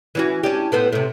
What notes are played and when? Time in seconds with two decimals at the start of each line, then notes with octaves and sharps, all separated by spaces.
0.15 E3 C#4 F#4
0.43 C#4 D4 G4
0.72 A2 B3 C5
0.93 A2 C3